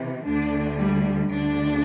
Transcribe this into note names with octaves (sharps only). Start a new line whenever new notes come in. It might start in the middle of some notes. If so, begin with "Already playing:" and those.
Already playing: C3 E3
D2 D3 D4
G3
D2 D3 D4